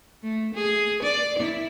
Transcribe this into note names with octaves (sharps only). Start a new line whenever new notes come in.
A3
G#4
D5
E4